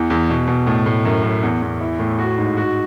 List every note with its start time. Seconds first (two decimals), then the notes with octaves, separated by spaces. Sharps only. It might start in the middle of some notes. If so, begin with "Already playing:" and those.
Already playing: E2 E3
0.10 E2
0.30 B2
0.47 B2
0.67 A2
0.86 A2
1.05 F#2
1.24 F#2
1.43 E2
1.62 E2
1.81 E4
1.99 A2
2.19 F#4
2.38 G#2
2.57 F#4